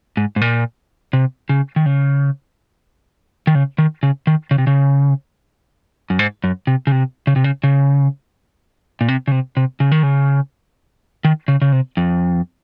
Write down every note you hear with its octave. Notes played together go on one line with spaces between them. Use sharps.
G#2
G#2
A#2
C3
C#3
D#3
C#3
D#3
C#3
D#3
C#3
D#3
C#3
C3
C#3
F#2
G#2
F#2
C3
C#3
C3
C#3
C3
C#3
C#3
A#2
C3
C#3
C3
C3
C#3
D#3
C#3
D#3
C#3
C#3
C3
F2